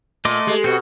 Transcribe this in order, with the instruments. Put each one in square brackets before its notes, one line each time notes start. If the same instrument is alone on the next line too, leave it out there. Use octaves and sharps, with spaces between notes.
[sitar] A#2 [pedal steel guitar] A3 D#5 D6 [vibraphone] C6
[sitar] G#3 [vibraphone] G4 A4
[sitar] B2 [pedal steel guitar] C4 F#4